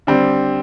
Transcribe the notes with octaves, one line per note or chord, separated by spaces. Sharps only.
D3 G3 C4